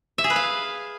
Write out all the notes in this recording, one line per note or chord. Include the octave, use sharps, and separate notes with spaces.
E5
G#4
B4
F5